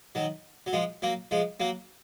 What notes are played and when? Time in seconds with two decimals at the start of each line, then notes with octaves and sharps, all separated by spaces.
0.15 D#3 F#3
0.66 F#3
0.73 F3 G#3
1.02 F#3 A#3
1.31 F3 G#3
1.60 F#3 A#3